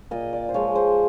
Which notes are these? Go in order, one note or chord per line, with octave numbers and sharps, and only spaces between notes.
A#2 D#5
D5
C5
F3 G#3 C#5
C5